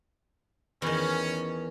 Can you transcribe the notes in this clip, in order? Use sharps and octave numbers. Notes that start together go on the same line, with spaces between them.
E2 D#3 C#4